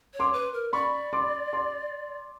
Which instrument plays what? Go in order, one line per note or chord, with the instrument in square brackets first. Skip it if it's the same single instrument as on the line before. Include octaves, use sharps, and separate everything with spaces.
[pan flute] C#5
[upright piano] C6 D6
[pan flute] B4
A#4
[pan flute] D5 [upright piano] B5 C#6
[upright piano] C6 D6
C6 D6